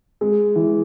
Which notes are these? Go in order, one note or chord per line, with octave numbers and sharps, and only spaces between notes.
G#3
E3